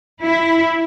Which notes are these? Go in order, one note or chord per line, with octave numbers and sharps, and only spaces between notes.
E4